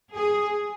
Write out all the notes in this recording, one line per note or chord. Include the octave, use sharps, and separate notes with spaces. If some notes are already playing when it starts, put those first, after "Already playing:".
G#4